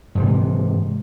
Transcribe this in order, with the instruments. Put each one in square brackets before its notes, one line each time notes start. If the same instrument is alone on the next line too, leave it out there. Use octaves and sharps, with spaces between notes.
[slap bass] G#2 C3 E3